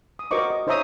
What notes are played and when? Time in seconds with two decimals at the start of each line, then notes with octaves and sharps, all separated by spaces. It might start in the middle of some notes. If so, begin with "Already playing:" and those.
0.19 D#6
0.31 F#4 A#4 C5 D#5 C#6 D6
0.51 D#5
0.67 D#4 C5 C#5 E5 A#5 D#6